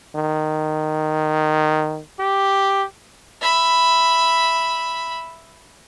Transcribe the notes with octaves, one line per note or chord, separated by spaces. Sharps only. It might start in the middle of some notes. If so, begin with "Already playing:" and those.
D#3
G4
E5 B5